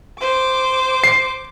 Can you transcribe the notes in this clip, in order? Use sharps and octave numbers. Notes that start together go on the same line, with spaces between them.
C5 D6
C7